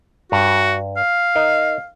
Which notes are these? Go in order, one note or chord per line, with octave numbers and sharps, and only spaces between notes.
G2 F#4
F5
D#4 A#4 D#5